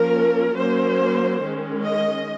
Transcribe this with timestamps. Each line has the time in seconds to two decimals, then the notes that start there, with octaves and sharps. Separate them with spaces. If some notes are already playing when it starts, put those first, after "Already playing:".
Already playing: F3 A#3 C#4 A#4
0.58 F#3 A#3 C#4 C5
1.43 D#3 G#3 C#4
1.85 D#5